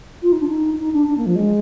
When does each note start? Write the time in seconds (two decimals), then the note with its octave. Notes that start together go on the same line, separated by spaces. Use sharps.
0.23 F4
0.32 D#4
0.40 D4
0.48 D#4
0.80 D#4
0.93 D4
1.08 D4
1.18 A#3
1.26 F3
1.36 G#3